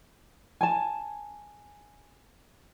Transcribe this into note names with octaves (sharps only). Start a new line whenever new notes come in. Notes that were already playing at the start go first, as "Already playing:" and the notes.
G#5 A5